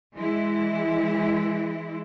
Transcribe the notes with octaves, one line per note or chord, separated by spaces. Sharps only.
E3 G#3 E4